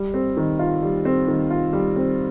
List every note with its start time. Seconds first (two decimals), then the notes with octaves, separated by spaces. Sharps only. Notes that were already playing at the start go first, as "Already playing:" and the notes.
Already playing: G3
0.14 C4
0.37 D#3
0.59 F4
0.83 G3
1.05 C4
1.28 D#3
1.50 F4
1.73 G3
1.96 C4